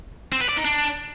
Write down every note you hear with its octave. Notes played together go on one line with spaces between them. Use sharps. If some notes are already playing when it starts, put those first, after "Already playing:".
C4
B4
D5
D#4
D4